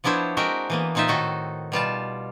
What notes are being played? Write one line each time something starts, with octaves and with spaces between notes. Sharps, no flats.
F3 B3 D4 E4 C5 C#5
G#3 C4 F#4 A#4 E5 G5
E3 A#3 B3
A#2 C4 D#4 F4 E5
A2 D#3 F#4 A4
B2 G3 F4 A5